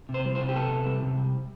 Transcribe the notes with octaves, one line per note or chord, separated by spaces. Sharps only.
C3
C5
G3
C5
C3
G4
B3 A4
C3
G3
C3
G3